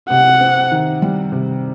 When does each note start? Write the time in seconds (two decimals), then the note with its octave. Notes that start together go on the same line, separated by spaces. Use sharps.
0.10 C3 F#5
0.41 C4
0.72 D#3
1.02 G3
1.32 C3